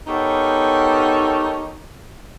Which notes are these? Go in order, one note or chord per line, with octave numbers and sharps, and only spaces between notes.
B3 D#4 G4 A4 A#4 C#5